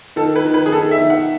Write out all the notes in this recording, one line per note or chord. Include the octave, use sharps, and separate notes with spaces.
D#3 A4
B4
D#3
B4
G#4
D#3 A4
E5
D#3
F#5